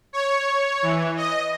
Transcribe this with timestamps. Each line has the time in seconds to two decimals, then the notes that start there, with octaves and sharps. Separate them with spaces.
0.13 C#5
0.82 E3
1.17 D#5